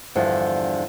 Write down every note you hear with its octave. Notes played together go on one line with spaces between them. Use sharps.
E2 G2 D3 F3